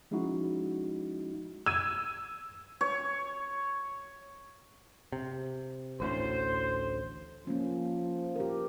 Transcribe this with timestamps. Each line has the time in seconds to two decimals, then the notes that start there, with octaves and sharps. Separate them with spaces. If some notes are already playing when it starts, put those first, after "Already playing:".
0.11 F3 G#3 C#4 D#4 E4 F#4
1.66 E6 G#6 D#7
2.81 C#5
5.12 C3
6.00 A1 D2 A2 C5
7.47 F3 A#3 C#4
8.36 G4 A#4